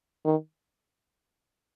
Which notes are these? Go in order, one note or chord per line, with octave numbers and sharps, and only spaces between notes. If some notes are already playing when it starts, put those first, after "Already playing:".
D#3